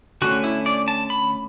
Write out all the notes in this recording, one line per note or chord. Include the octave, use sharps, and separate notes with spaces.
D3 A3 C#4 F#4
E4
D5
A5
B5